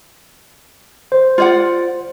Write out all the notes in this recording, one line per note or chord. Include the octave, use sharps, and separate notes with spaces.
C5
F4 D5 F#5